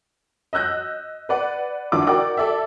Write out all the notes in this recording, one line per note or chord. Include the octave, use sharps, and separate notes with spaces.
D#5 E6 F#6 G6 A#6
B4 D5 F#5
G#1 D4 E4 F4 D6
F#4 A#4 D5 F#5 G5 D6
A4 D5 E5